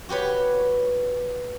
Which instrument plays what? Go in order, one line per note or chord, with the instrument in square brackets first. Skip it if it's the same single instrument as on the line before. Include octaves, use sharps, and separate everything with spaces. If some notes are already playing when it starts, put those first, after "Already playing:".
[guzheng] F#4 G4 B4 C#5